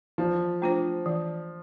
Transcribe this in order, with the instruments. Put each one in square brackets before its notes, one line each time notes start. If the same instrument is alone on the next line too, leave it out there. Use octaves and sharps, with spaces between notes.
[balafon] E3 [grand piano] F3
[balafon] A3 D4 F4 C5
E3